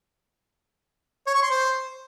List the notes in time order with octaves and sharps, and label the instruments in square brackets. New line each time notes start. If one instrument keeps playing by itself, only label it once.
[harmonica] C#5
C#6
C6
C5